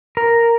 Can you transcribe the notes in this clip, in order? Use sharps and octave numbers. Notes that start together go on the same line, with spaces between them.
A#4